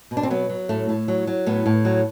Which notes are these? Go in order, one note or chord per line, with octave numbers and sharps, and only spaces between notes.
B2
D4
C4
F#3 B3
F#3
A2 A3
A2
F#3
F#3
A2 B3
A2
F#3